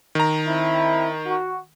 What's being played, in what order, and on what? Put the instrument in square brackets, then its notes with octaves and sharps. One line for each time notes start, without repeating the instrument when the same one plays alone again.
[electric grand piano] D#3 A#5
[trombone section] C4 E4
F#4